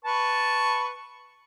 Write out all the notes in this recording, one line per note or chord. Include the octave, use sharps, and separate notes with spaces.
B4 A5 C#6